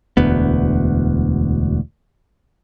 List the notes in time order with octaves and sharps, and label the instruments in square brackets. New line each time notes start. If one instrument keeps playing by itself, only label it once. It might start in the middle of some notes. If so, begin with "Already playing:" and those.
[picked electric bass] E1 D2 B3